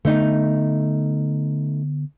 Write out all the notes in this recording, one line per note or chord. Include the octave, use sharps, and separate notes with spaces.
D3 A3 B3 D#4